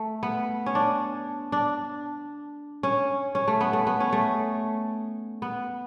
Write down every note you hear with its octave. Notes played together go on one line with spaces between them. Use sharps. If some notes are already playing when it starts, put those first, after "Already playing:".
Already playing: A3
B3
C#4
D4
D4
C#4
C#4
A3
B3
A3
B3
C#4
A3
B3